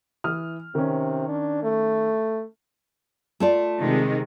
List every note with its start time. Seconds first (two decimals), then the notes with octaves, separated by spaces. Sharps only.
0.24 E3 D#6 F6
0.75 C3 D#3 C#4
1.28 D4
1.63 A3
3.40 A3 F4 D5
3.79 C3 D#3 G#3